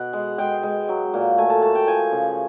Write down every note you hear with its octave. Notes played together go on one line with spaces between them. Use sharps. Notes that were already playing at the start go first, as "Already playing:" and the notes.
Already playing: B2 F#5
G#3
G#3 G5
G#3
F#3
A#2
A3 G#5
A5
A3 A5
G5
F3 G#5
C#3